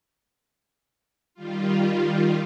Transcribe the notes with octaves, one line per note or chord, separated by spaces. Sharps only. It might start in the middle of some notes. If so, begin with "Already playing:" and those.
D#3 G3 F4